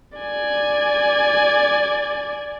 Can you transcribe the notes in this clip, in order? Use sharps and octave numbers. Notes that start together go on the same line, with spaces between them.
D5 G#5